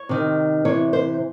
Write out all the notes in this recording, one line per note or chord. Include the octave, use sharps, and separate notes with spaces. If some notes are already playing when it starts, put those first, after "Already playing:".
Already playing: C#5
C3 D#3
C3 E3 C#5
C5